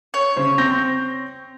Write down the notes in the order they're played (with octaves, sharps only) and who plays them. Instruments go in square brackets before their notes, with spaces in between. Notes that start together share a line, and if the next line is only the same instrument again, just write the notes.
[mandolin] C#5
[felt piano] C#3 C5
C4 G6 A#6